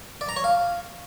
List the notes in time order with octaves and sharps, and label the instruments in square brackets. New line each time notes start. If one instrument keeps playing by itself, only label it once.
[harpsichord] D5
A#5
C#5
F5